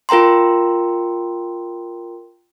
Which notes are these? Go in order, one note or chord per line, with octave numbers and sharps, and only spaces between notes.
F4 A#4 G5 A#5 C6